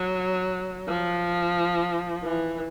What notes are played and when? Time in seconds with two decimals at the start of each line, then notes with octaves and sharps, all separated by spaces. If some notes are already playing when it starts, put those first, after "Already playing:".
Already playing: F#3
0.88 F3
2.23 E3